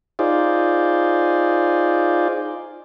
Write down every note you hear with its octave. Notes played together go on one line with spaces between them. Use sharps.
D#4 F4 G#4 C5 D5